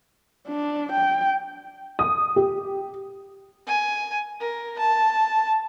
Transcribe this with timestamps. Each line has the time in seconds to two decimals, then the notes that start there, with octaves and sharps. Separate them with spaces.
0.47 D4
0.93 G5
1.99 D#6
2.36 G4
3.67 G#5
4.40 A#4
4.78 A5